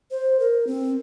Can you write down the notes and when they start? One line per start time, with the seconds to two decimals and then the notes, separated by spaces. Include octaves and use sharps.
0.11 C5
0.39 A#4
0.67 C4